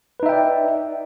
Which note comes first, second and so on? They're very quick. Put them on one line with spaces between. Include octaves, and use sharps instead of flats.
B4 D#4 E5 G5 D5